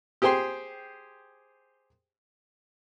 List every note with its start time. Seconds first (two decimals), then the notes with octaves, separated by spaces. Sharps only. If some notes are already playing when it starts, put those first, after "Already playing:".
0.22 G4 G#4 C5 G5 C6